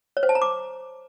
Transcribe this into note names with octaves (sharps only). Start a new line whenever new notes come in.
C#5
C5
A5
A#5
D6